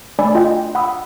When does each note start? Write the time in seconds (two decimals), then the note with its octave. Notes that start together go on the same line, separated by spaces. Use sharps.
0.19 A3 D4 D5 G#5 B5 E6
0.35 F4 D#5 G5
0.75 F#5 B5 D#6 E6